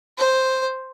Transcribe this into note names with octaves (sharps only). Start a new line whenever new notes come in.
C5